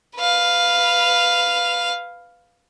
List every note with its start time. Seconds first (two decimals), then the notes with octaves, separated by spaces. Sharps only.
0.16 B4 F5